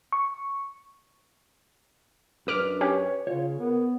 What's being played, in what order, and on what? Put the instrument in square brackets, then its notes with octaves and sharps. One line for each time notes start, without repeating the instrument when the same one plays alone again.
[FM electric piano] C#6
[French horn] F#2 [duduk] D4 [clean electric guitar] B4 [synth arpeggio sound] D6 F6
[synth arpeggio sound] C#4 G4 [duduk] C#5
[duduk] C#3 [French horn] F4 [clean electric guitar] C#5
[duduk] B3 [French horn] A#4